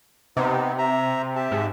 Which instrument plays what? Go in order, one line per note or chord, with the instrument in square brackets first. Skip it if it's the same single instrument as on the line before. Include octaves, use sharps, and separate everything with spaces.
[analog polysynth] C3 [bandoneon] B3 D#4
[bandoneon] E5 A#5
G4 E5 A5
[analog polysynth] G#2